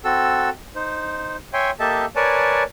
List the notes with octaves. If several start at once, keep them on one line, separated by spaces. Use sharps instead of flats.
C4 F#4 A4 E6
D#4 C5
C#5 E5 G5 G#5 C6
A#3 G4 A4 D#5 E5 A5
A#4 B4 C#5 D5 G#5 A5